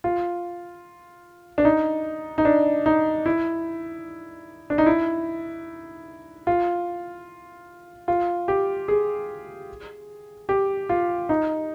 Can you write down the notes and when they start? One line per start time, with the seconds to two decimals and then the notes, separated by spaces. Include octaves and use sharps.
0.04 F4
1.58 D4
1.65 D#4
2.38 D#4
2.45 D4
2.86 D#4
3.26 E4
4.70 D4
4.78 D#4
4.86 E4
6.47 F4
8.08 F4
8.48 G4
8.88 G#4
10.49 G4
10.89 F4
11.29 D#4